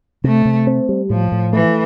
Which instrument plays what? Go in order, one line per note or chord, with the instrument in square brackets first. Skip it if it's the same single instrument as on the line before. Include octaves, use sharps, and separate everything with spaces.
[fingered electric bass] C3 [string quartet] A3
[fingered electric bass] C3
C4
G3
[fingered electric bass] A2 [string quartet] F3
[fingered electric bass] A2
[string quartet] E3 [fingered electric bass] A3